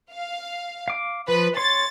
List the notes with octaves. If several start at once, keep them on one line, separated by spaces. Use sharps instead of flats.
F5
F5 D6
F3 B4
C#5 C6 A6